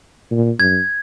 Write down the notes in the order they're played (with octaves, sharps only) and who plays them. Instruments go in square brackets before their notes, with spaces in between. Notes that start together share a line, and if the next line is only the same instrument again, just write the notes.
[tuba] A#2
[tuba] F#2 [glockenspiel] G#6